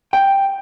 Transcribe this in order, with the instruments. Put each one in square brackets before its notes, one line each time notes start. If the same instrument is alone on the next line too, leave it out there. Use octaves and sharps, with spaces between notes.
[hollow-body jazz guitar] G5